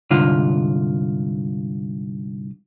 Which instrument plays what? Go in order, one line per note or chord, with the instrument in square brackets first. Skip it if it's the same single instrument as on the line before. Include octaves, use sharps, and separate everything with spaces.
[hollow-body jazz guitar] C2 G#2 D3 F4